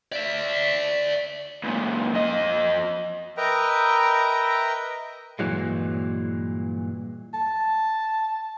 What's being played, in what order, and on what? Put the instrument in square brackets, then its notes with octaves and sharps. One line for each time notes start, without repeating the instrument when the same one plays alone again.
[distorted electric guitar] D5 E5
[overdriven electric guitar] C#2 A#2
F2 D#5
[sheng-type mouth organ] A#4 B4 D#5 E5 G5 A#5
[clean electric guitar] G2 A#2 D3 E3 F#3 G#3
[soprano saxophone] A5